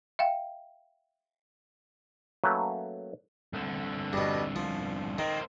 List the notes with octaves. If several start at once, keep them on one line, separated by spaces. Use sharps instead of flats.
E5 F5 G5
F#3 A3 A#3 C#4 B4
C2 D3
G2 B2
F3
D#3 A#3 C4